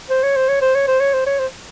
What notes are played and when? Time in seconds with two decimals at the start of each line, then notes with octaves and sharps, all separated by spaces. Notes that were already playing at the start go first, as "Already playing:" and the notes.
0.10 C5
0.23 C#5
0.36 C5
0.49 C#5
0.61 C5
0.75 C#5
0.88 C5
1.00 C#5
1.14 C5
1.27 C#5
1.39 C5